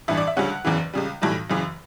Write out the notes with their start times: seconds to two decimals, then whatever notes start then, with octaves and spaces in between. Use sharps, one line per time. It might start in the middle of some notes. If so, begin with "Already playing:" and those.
0.08 A1 G2 E3 E5
0.17 D5
0.27 E5
0.37 D2 C#3 G3 C#4 F#5
0.65 F#1 E2 C#3 E3
0.94 C#2 C#3 G3
1.22 B1 A2 E3 G3
1.50 F#1 F#2 C#3 E3